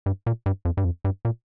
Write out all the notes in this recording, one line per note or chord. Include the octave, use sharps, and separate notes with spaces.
G2
A#2
G2
F2
G2
F2
G2
A#2